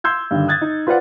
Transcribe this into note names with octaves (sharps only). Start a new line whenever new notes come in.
C6 E6 G6 G#6
G2 D3 D#3
D#6 F#6 G#6 A6
D#4
F4 B4 C5 D5 F5 F#5